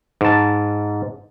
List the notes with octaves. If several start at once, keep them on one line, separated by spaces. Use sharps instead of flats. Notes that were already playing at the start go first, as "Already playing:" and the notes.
G#2 A5